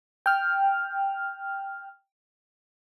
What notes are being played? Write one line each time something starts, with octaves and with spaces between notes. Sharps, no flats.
G5 F6